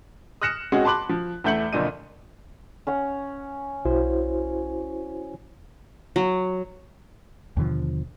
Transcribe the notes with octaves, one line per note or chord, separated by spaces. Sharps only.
D#6 F6 F#6 A#6 C#7 E7
G#3 C4 C#4 F#4 G#4
A5 B5 C6 D6 F#6 F#7
F3
E2 A3 E5 G6 C#7 F#7
F#1 F2 A#2 D4 D#5 D#7
C#4 C#5 F#5
B1 E4 F#4 C5
F#3
D#2 B2 D3 F3